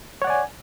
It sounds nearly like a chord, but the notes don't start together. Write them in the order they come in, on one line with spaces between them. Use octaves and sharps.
C#5 F#5 D5 G#5